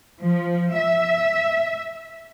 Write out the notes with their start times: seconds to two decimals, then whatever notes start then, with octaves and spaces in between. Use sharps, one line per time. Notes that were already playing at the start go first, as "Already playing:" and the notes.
0.21 F3
0.77 E5